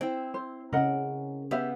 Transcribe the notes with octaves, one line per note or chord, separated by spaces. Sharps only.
C4 E4 G5
C5
C#3 C#4 A#4 D#5 F#5
B3 G4 E5 F5